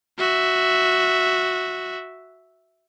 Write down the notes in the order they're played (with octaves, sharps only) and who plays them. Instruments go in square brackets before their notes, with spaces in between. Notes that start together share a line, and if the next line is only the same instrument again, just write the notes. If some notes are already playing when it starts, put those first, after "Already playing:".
[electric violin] F#4 E5